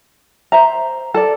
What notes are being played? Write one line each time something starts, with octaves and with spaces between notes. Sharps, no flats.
C5 E5 A#5
A4 D5